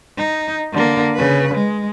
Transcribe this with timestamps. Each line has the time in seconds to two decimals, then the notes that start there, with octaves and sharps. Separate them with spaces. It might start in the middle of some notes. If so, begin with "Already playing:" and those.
0.18 D#4
0.73 D3 A#3
1.14 C#3 B4
1.54 G#3